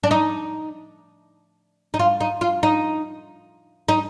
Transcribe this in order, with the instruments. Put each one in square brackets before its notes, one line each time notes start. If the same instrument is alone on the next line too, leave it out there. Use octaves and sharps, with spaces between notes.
[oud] D4
D#4
D#4
F4
D#4
F4
D#4
D#4